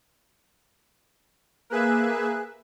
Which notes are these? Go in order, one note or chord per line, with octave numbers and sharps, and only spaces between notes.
A#3 G#4 B4 E5 F#6